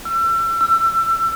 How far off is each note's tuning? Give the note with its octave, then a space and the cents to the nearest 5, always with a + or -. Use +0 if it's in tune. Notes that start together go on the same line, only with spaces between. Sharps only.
E6 +35
E6 +25